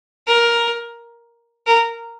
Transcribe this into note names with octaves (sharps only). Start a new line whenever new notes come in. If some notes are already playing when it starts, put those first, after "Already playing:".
A#4
A#4